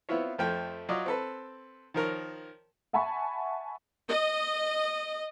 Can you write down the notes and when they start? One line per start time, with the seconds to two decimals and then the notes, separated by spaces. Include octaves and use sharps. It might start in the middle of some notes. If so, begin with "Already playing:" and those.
0.09 B3 C4 E4 F4 C#5
0.38 F2 F3 A3 G5
0.89 F#3 F4 D5 D#5
1.06 C4 A4 B4
1.94 D#3 F3 A#4 C#5
2.93 E5 F#5 G#5 A5 B5 C#6
4.06 D#5